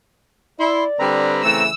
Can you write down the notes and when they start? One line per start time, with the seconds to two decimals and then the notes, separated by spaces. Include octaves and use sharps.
0.60 E4 D5 C6
0.99 D3 G3 C4 B4 A#5
1.44 C#3 E3 A3 E6